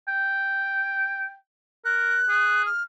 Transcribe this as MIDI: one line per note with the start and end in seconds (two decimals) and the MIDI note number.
0.08 1.35 79
1.85 2.20 70
1.85 2.62 90
2.29 2.66 68
2.66 2.83 89